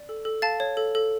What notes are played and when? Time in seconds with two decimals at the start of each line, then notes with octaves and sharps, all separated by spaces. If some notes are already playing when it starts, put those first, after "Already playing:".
Already playing: D5
0.09 A4
0.25 A4
0.42 F5 A5 A6
0.60 C#5
0.77 A4
0.95 A4